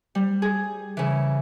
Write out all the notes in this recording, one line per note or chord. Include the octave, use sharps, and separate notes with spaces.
G3
G#4
C#3 E3